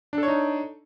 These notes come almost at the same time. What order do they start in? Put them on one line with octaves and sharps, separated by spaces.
D4 A4 C#5 D#4